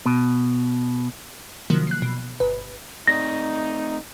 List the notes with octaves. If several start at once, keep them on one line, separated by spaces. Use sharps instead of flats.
B2
C3 D#3 F3 F#3 A#3
F#6 C7
B2
G1 B4
A3 C4 D#4 D5 A#6